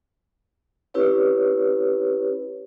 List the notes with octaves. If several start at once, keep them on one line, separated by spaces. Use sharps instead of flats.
C#4 E4 G4 B4 C#5